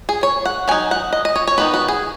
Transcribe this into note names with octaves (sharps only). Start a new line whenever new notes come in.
G#4
C#5
F#5
F#3 D#4 G#5
F#5
D#5
D#5
C#5
C#5
D#3 B3 D#4 B4
F#4
G#4